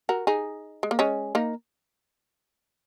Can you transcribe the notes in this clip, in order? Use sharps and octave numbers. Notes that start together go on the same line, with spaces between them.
F#4 A#4
D#4 G#4
G#3
A#3
G#3 C#4
A#3 D#4